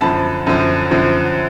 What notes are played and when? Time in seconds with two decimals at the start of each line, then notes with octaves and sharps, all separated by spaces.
0.01 F#2 D3 F3 A5 B5
0.46 F#2 D3 F3
0.91 F#2 D3 F3